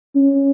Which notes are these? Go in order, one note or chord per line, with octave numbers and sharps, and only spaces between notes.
C#4